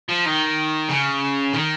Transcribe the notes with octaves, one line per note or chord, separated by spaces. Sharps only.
F3
D#3
C#3
D#3